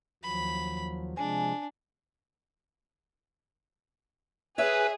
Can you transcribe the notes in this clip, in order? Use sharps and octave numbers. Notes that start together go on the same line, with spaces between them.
D#2 F3 F#3 B5
C3 F3 G#3 D4 G#5
G#4 B4 C#5 E5